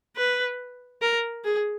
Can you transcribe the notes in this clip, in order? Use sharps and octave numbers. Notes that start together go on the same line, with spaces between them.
B4
A#4
G#4